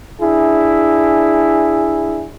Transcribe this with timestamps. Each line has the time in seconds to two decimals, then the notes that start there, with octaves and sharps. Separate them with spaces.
0.20 D4 E4 G#4